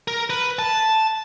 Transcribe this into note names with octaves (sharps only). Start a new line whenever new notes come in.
A#4
B4
A5